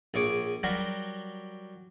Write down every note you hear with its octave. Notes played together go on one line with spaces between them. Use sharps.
A#1 G#4 C#5 D6
F#3 G3 F#4 G4 A#4